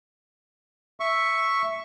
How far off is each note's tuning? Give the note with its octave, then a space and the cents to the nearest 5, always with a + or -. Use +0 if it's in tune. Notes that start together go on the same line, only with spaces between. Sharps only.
E5 +0 C#6 +0